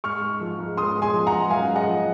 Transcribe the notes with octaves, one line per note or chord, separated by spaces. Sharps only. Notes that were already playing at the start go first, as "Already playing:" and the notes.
G#2 C#6 F6
G#3
F3
G#2
G#2 C6 D#6
G#3
G#5 C6
F3
F#5 A#5
G#2
F#2 F5 G#5
G#3
D#5 F#5
F3